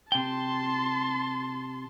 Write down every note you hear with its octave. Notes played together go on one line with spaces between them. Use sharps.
C3 G5 A5 C6